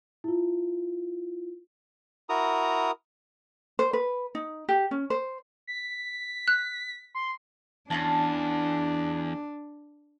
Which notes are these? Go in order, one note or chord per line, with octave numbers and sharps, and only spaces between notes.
E4 F4
E4 F#4 A#4 A#5 D#6
C5
B4
D#4
G4
C#4
C5
B6
F#6
C6
E2 C#4 D4 F4 A5